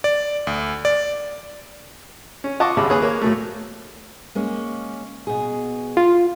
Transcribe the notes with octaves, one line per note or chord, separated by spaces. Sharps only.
D5
D2
D5
C#4
F4 D#5 F#5 A5 C#6 D6
G#1 C#2 G2 E5 A5 B5
D#2 G#4 B4 C#5 D#6 F#6
A#3 C#5
A2 F#3 A3
G#3 A#3 C#4
B2 G#4
F4